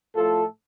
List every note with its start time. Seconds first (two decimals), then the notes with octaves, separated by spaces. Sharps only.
0.16 A2 F3 A3 F4 A4